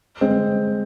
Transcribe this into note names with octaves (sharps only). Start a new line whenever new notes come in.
G#3 C4